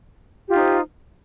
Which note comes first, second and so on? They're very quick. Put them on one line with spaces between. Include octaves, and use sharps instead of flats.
G4 F4 D#4 C5